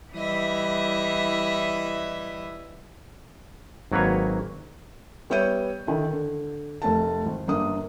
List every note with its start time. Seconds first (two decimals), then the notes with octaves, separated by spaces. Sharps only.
0.13 E3 G3 E4 D#5 E5
3.92 G#1 F#3 A#3 B4 C#5
5.30 G3 B3 C#5 E5 G6 D#7
5.87 D3 D#3 E4
6.13 D3
6.82 F1 A3 A#4 A5
7.26 G#1
7.47 G1 A#3 D4 D#6